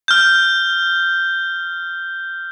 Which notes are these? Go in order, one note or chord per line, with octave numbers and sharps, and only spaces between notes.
F6 G6